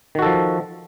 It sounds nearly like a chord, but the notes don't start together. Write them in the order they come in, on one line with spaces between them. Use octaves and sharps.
D#3 F#4 A4 F3